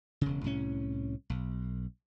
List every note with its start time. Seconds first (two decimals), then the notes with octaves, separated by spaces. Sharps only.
0.21 E1 C#3
0.44 C2 A2 C#4
1.30 B1